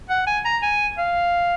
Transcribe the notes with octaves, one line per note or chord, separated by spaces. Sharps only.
F#5
G#5
A#5
G#5
F5